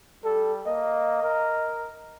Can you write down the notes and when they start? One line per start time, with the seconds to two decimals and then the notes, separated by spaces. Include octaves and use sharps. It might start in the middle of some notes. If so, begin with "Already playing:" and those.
0.24 G3 A4
0.67 A#3 D#5
1.23 A#4